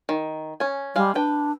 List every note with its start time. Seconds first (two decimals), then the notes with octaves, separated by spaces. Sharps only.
0.09 D#3
0.60 C#4 G#5
0.96 G3 G#3 F5
1.15 D4 B4 G5